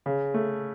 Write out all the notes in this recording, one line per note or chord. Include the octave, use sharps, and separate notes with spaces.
C#3
A3